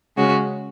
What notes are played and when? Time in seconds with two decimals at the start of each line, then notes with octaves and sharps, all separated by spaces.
0.17 C#3 G#3 C#4 F#4